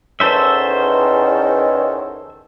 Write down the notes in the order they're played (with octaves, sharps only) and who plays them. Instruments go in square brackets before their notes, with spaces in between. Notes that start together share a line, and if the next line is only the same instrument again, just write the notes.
[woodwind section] E2 D#3 [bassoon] C#4 [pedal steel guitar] A4 C5 E5